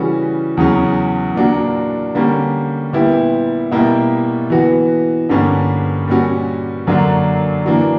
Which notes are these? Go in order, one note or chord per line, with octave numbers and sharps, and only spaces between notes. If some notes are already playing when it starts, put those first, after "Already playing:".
Already playing: C#3 E3 G3 C#4 F#4
E2 C#3 F#3 C#4
A#2 A#3 D4 F#4
D3 G3 A#3 C#4 G4
A#2 G3 B3 E4 G4
B2 G3 A#3 E4 G4
E3 B3 F#4
G2 D3 G3 A#3 C#4
A#2 G3 C#4 F#4
F#2 D3 F#3 A#3 D4
E3 A#3 D4 F#4